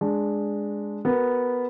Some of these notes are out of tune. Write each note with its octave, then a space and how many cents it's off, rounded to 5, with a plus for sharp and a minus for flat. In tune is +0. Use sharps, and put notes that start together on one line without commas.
G#3 +0 D4 +0
B3 +0 F#4 +35 A#4 +0